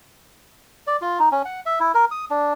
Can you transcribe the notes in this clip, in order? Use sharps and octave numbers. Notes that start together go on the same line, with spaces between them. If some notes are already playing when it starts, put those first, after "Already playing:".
D5
F4
D#4
C#4
F#5
E5
E4
A#4
D#6
D4